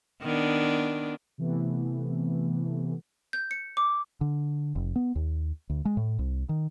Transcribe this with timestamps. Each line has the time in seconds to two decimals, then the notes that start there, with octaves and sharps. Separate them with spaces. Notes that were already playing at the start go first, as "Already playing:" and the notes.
0.22 D#3 B3 D4
1.38 C3 E3 A3 B3
3.33 G6
3.51 C#7
3.77 D6
4.21 D3
4.76 F1
4.96 B3
5.15 D#2
5.70 D2
5.85 G#3
5.97 A2
6.19 C2
6.49 D#3